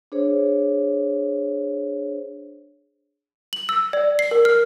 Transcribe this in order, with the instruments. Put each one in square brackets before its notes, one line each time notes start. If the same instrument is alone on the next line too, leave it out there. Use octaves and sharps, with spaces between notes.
[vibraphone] D4 G#4 C5 C#5
[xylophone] F#7
E6
D5
C7
A#4
F6